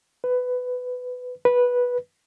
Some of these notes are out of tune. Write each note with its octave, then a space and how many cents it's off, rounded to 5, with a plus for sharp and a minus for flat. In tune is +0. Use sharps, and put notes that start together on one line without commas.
B4 +15
B4 -10